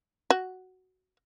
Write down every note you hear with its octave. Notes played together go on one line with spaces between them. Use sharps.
F#4